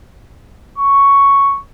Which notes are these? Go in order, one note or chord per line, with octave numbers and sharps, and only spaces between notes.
C#6